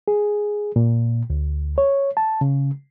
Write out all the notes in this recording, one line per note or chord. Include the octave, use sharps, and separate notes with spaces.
G#4
A#2
D2
C#5
A5
C#3